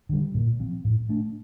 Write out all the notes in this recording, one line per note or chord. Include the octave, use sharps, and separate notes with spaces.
D3 G3
A#2
F3 C4
A2
A3 D4